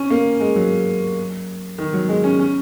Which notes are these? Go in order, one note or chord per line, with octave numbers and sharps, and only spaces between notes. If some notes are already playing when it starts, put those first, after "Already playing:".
Already playing: C#4
A#3
G#3
F#3
D#3
F#3
G#3
C#4
C#4